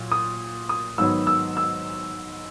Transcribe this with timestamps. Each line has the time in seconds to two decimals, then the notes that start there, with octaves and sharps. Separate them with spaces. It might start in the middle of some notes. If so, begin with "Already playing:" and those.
Already playing: A#2 F#3
0.12 D#6
0.69 D#6
0.98 G#2 D#3 F#3 B3 E6
1.27 E6
1.57 E6